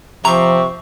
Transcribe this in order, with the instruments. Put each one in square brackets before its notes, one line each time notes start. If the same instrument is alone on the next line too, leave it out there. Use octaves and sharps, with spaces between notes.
[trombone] C3 [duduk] F3 [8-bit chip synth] A#5 [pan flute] C#6